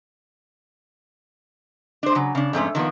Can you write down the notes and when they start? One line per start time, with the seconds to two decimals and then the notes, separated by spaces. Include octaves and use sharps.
2.03 D4 C5
2.15 C#3 F#3
2.35 C#3 D4
2.53 F2 G#2 A3 C#4
2.75 D#3 F3 A#3 B3